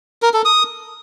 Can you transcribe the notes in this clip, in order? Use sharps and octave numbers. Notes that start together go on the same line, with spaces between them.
A#4
A4
D#6